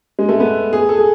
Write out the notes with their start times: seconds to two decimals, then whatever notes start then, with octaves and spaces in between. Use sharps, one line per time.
0.19 G#3
0.29 A3
0.40 B3
0.73 G#4
0.89 A4
0.97 G#4